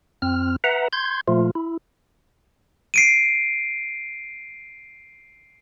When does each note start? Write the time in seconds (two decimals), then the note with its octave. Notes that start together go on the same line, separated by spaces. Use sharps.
0.22 F2 C4 F6
0.64 B4 E5 F#5 A#5
0.93 C6 G6 G#6
1.28 A#2 F3 A3 F4
1.55 E4
2.94 C7 D7 D#7